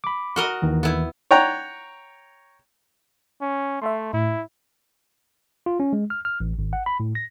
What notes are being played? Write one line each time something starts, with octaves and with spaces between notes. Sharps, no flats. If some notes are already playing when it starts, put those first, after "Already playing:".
B5 D6
F#4 A#4 D#5
D#2 D#3 E3
B3 E4
C#5 F#5 G5 A#5
C#4
A3 E5 C6
A2 E4
F4
C#4
G#3
F6
F6
A1
G#1
F#5
B5
A2
A#6